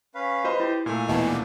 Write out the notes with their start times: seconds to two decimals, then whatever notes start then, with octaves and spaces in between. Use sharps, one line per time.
0.15 C#4 B4 F5
0.44 F#4 B4 C5 D#5 B5 C6
0.60 E4 G4
0.86 A#2 A3 G#5 F6
1.08 D#2 B2 E3 D#5 A5
1.26 D4